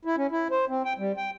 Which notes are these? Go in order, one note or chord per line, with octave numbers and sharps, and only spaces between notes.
E4
C#4
E4
C5
C4
G5
G3
G5